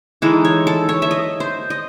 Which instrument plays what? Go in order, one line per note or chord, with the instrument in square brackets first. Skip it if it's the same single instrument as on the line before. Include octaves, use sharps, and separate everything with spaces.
[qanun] E3 G#3 D#4 A4
C#5
A4
C#5
E5
D#5
C5
D#5